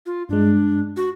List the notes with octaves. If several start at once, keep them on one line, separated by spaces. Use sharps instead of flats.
F4
G2 G#3 D4
F#4